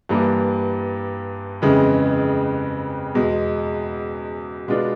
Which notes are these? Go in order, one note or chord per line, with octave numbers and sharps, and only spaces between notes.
G2 E3 G3 A#3
F2 C#3 E3 G#3
E2 B2 G#3
B2 G#3 B3 D4 F4